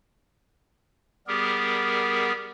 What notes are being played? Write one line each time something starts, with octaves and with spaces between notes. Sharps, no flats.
G3 B3 G4 G#4 A#4